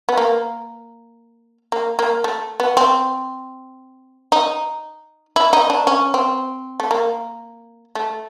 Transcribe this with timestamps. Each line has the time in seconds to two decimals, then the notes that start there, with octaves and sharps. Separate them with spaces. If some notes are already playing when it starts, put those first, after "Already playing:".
0.09 B3
0.17 A#3
1.72 A#3
1.99 A#3
2.24 A3
2.60 B3
2.77 C4
4.32 D#4
5.36 E4
5.53 D#4
5.70 D4
5.87 C#4
6.14 C4
6.80 A3
6.91 A#3
7.95 A3